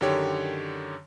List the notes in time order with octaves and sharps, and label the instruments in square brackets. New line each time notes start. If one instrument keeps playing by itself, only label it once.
[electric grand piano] F#2 D3 D#3 G4 C#5